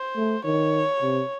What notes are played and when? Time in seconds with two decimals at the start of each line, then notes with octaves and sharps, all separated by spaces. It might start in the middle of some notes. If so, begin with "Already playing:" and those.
Already playing: C5
0.16 A3
0.45 D#3 C#5
1.02 C3